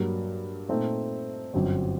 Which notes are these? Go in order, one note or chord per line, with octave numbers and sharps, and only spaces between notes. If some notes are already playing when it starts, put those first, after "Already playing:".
Already playing: G2 F#3 A#3
A#2 A3 C4 D#4
G1 F#2 F#3 C4